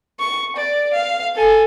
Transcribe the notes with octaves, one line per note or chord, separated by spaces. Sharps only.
C#6
D5
F5
A4 G#5